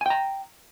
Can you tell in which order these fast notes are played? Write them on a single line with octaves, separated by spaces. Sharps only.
G#5 G5 A#5